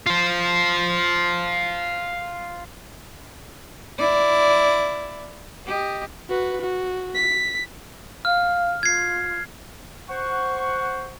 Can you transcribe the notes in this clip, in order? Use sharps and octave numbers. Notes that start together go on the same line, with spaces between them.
F4 C5
E4 D5
G4 D#5
F#4 B4
F#4
B6
F5 F6
F4 G#6 C7
C5 F#5 C#6